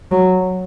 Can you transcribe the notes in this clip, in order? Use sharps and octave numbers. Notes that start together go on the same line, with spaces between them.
F#3